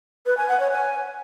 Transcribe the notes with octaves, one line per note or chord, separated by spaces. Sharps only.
B4
G#5
F#5
C#5
G#5